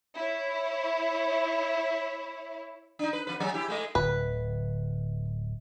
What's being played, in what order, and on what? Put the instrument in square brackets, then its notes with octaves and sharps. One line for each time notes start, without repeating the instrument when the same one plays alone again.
[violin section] E4 C#5
[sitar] D4 D#4
B4
F2 B4
F#3 C#4 G#4
E4 G4
G#3 A3 D#5
[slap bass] D1 D3 [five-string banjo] B4